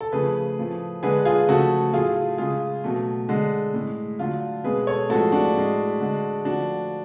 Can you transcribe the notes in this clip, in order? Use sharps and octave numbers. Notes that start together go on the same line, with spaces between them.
A4
C#3 F3 A3 G#4 B4
A2 F3 A3
D3 G#3 G#4 B4
F4 G#4
C#3 F3 A3 F#4 A4
A2 F#3 A3 F4 G#4
F4
C#3 G#3 F4 G#4
B2 F#3 A3
D3 G#3
A2 G#3
D3 F#3 A3 F4
B2 G#3 G#4 B4
A4 C#5
A2 F3 G#3 F#4 A4
D4 F#4
A2 G#3
D3 G#3
D3 F3 A3 D4 F#4